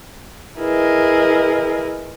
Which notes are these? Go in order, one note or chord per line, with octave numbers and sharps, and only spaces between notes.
E4 G#4 A#4 B4 D#5